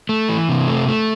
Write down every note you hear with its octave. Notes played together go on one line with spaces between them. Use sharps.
A3
E3
C3
A3
A3